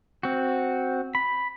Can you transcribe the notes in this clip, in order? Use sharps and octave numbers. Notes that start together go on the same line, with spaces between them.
C4 F#4
B5